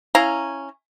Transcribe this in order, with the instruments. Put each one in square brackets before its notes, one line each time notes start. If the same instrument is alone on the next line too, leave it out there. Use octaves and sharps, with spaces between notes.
[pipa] C#4 E4 F5 A#5